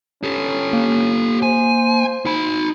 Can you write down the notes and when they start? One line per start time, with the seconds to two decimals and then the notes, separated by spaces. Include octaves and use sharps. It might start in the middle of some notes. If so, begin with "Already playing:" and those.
0.23 C#4 G4 A4
0.73 A#3
1.43 C5 G#5
2.25 D#4 B5